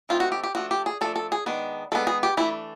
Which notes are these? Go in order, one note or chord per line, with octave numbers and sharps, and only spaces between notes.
E3 A3 C4 D#4 F4
F#4
G4
G4
F3 A3 D4 F#4
G4
G#4
F3 A3 D4 A4
A4
G#4
D#3 G#3 B3 D4
D#3 G#3 B3 D4 A4
G#4
G4
E3 A3 D4 E4